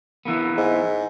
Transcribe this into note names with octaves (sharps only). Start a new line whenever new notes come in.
E3 A#3 B3
G#2